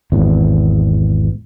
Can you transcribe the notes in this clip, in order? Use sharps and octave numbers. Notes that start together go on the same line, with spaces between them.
G#1 E2